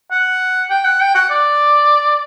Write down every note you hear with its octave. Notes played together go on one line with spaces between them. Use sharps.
F#5
G5
F#5
G5
F#5
D5